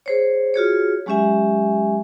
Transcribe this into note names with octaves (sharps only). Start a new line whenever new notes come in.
G#4 C5 C#5
F4 F#4 G#4 C#5
F#3 G#3 C#4 G4 E5 G#5